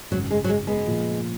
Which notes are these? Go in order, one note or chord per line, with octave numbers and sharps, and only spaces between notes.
G#1 F#2 C#3 F#3
G#3
F#3
G#3
G#3 B3
A#2 F3 A#3 F4